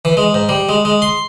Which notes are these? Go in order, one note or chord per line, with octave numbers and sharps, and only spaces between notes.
E3
G#3
G#2
G3
G#3
G#3
C6